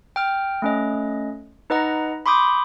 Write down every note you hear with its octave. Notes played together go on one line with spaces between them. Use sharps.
G5 F6
A3 C#4 D#5
D#4 B4 D#5 F#5 A#5
B5 C6 D6 D#6 G6